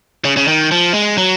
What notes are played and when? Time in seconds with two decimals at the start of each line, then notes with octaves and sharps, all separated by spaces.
0.25 C#3
0.37 C#3
0.48 D#3
0.71 F3
0.94 G#3
1.18 F#3